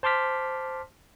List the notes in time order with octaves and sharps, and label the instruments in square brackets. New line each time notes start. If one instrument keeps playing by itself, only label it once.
[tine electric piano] C5 A5 C6 D6 F6 B6